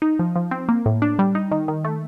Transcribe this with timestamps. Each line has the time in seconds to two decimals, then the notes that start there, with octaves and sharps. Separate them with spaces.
0.02 D#4
0.19 F3
0.36 F3
0.51 C4
0.69 A#3
0.86 A2
1.02 D4
1.19 G3
1.35 D#4
1.51 D#3
1.68 D#3
1.85 A3